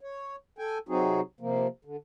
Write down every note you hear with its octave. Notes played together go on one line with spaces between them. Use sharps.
C#5
A4 G5 G#5
C3 F#3 C4 D#4 F#4 G#4
C3 F3 A#3
D3